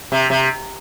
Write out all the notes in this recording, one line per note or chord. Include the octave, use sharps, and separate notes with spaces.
C3
C3